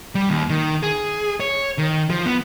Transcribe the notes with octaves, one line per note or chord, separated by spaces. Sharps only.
G3
D#2
D#3
G#4
C#5
D#3
F3
B3